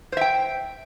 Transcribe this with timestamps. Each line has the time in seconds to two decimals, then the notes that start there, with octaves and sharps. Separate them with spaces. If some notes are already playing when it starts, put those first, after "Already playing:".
0.12 C5
0.17 E5
0.21 G5